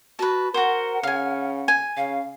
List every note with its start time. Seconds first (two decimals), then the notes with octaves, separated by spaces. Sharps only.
0.19 F#4 B4 A5
0.54 F#4 A#4 C5 F#5
1.03 C#3 F5 G#5
1.68 G#5
1.97 C#3 F5